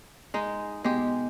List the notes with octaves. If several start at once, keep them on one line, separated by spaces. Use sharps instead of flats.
G#3 D#4
B2 G#3 G4